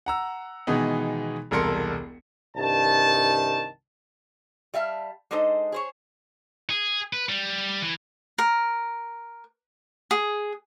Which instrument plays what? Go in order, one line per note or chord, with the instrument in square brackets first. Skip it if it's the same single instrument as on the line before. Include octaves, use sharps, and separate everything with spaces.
[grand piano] F#5 A#5 E6
B2 D#3 E3 G#3 B3 D#4
E1 C2 A4 A#4 C6 C#7
[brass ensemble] C2 G2 D#3 A5
[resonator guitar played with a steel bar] G3 E5 F5 A5
G#3 D4 D#4 A4 C5 D#5
G#4 C5 C#5
[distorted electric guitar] G#4
B4
G3
E3
[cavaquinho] A#4
G#4